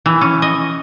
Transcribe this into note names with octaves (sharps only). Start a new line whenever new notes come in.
E3
C#4
D#5